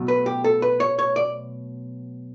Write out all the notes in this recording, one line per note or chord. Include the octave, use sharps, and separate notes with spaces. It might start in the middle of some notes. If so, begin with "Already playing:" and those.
Already playing: B2 F#3 A3
B4
G4
A4
B4
C#5
C#5
D5